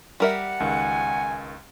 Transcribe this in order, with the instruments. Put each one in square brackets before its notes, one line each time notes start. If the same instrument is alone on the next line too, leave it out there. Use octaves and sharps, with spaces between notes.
[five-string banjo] G3 A#4 E5 [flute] F#5
[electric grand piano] C#2 D#3 F5 [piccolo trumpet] G#5